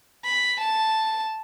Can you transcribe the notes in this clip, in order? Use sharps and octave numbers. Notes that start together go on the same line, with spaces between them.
B5
A5